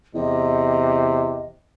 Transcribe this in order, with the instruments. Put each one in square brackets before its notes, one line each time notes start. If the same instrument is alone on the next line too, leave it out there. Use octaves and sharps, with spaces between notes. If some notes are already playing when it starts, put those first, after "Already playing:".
[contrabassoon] E2 [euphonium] C3 [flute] D#5